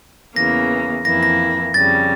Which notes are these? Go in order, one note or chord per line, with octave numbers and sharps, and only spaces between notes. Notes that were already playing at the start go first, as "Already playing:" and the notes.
E2 C#3 E3 A#3 A#6
F2 E3 A#3 E4 A#6
A#6
F2 C#3 G3 A6